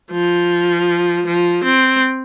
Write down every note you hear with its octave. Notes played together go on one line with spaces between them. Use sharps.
F3
F3
C4